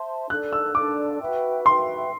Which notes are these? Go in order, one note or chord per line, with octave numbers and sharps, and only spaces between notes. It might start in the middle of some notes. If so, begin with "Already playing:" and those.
Already playing: C5 E5 A5 C6
D4 A4 D5 F#6
E6
D4 A4 D5 D6
F#4 B4 E5 G5
F#4 B4 E5 G5 C6